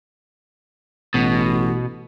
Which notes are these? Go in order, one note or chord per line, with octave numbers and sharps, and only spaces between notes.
A1 B2